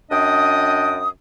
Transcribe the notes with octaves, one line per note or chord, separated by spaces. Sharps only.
F#2 D4 D#5 G5 D#6